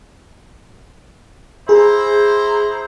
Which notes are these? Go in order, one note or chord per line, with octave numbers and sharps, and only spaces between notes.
E4 G#4 C5 A#5